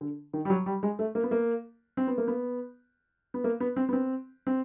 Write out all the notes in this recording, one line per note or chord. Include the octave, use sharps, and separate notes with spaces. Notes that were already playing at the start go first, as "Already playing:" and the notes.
D3
D#3
G3
F#3
G3
G#3
A3
A#3
B3
A#3
C4
B3
A#3
B3
B3
A#3
B3
C4
B3
C4
C4